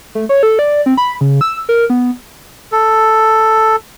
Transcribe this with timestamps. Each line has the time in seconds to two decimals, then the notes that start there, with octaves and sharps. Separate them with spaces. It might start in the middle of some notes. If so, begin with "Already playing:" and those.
0.15 A3
0.29 C#5
0.43 A4
0.59 D5
0.86 C4
0.97 B5
1.21 C#3
1.41 E6
1.69 A#4
1.90 B3
2.72 A4